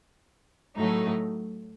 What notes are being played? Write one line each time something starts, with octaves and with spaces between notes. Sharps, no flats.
A2 F#3 A3 D#4